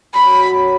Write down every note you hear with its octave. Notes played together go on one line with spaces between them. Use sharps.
F#2 B5
F#3
F#2